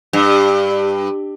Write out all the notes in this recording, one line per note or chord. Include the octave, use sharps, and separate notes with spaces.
G2